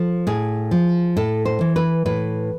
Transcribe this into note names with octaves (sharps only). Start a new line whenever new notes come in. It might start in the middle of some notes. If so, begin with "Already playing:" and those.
Already playing: F3 A4
A2 G#4
F3
A2 A4
C5
E3
B4
A2 B4